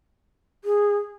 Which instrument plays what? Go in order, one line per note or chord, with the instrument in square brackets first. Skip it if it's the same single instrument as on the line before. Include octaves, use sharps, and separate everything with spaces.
[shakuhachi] G#4